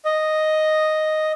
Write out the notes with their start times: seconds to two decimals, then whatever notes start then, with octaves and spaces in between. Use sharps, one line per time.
0.05 D#5